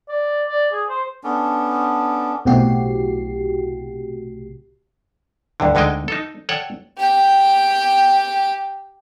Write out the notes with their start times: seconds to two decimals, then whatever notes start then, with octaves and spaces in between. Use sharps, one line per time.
0.09 D5
0.48 D5
0.72 G#4
0.89 C5
1.24 B3 C#4 D4 A4
2.45 B1 A2 C3 F#4 G4 C7
5.60 D2 G2 D3
5.75 D2 D3 G#3 D#4 D#5 G5
6.08 D#4 A4
6.49 A4 C#5 D5 F#5 G5
6.98 G4 G5